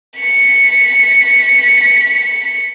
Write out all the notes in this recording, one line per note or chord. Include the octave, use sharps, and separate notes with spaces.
B6 C#7